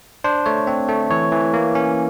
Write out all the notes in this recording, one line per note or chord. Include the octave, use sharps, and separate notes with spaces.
D4 C5
A3 C#5
C4
A3
E3 C#5
E3
A#3
C#4